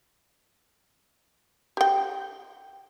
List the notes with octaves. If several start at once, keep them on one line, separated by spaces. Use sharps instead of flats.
G4 G5